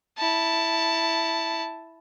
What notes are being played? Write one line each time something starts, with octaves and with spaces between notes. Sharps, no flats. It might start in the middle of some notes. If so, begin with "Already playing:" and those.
E4 A5